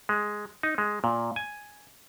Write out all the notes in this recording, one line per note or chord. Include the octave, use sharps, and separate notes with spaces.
G#3
D#4
G#3
A#2
G#5